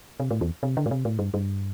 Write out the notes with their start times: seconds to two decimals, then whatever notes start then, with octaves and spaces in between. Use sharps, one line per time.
0.20 C3
0.31 A2
0.41 E2
0.63 C3
0.77 D3
0.86 A2
0.91 C3
1.05 A2
1.19 G2
1.34 G2